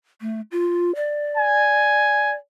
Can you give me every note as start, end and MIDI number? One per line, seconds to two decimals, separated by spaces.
0.21 0.41 57
0.51 0.94 65
0.95 2.35 74
1.37 2.33 80